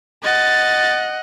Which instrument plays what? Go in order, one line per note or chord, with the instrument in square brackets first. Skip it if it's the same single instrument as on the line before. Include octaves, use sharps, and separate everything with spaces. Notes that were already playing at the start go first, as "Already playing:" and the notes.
[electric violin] D#5 F#5 [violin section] A6